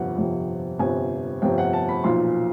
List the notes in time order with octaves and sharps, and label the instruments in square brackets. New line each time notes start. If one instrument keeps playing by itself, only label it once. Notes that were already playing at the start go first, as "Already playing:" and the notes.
Already playing: [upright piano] G1 F2 C3 F3 F#5
G1 F2 C3 F3
G1 F2 C3 F3 G#5
G1 F2 C3 F3 G5
F#5
A5
B5
B1 A#2 F3 C6